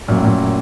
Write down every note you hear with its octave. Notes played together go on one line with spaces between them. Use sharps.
F#2 A#2
A2
F#2 A#2